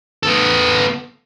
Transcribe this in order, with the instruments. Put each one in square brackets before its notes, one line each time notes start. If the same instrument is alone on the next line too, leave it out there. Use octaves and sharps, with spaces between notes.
[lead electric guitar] B3 A4